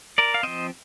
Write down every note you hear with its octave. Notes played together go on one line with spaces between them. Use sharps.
A#4 D5
F5
F3 C4 C5 D#5